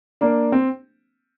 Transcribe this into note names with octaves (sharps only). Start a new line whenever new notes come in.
A#3 D4
C4